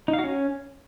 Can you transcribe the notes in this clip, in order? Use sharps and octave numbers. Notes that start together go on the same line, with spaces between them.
D#4
F5
F#4
C#4